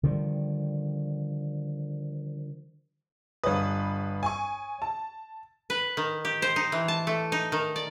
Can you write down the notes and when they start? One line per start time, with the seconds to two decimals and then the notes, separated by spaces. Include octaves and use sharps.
0.03 D3 D#3 F3 G3
3.44 G1 B4 C#5 D#6
4.23 G#5 C#6
4.82 A5
5.70 B4
5.97 D#3
6.25 G4
6.42 C5
6.56 D#4
6.72 E3
6.88 A5
7.07 A3
7.32 D#4
7.52 D#3
7.76 D5